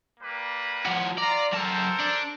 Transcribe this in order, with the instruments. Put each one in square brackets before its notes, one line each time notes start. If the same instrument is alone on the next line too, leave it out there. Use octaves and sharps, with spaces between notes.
[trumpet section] G3 A#3 B4
[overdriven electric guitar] F3 F#4
[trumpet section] F4 A#5 [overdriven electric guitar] D5
[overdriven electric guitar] F#2 A5 [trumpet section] A4 A#4 C5
[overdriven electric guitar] D4